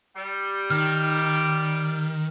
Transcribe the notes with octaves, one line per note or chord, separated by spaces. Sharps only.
G3
D#3 F6